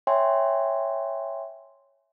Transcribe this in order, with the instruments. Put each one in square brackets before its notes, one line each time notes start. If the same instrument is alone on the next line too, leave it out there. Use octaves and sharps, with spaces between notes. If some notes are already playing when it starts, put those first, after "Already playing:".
[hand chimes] C#5 E5 G5 G#5 C6